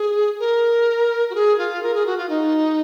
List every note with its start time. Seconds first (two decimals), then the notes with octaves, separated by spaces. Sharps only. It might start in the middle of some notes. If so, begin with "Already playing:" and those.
Already playing: G#4
0.39 A#4
1.30 F#4
1.35 G#4
1.58 F4
1.83 A#4
1.94 G#4
2.06 F#4
2.17 F4
2.29 D#4